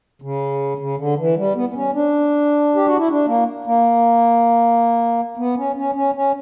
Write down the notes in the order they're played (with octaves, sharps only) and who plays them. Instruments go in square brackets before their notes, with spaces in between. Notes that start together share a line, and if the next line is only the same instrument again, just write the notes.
[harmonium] C#3
C#3
D3
E3
G3
B3
B3
C#4
D4
G4
F#4
E4
D4
A#3
A#3
B3
C#4
C#4
C#4
C#4